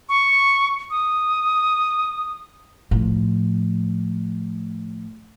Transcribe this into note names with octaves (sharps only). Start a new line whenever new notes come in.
C#6
D#6
A2 F3